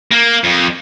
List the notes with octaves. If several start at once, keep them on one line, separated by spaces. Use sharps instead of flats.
A#3
F2